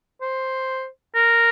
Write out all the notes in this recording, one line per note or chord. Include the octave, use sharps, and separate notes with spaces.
C5
A#4